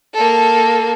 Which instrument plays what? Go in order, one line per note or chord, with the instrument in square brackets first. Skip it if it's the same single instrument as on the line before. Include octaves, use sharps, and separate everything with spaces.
[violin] A#3 A4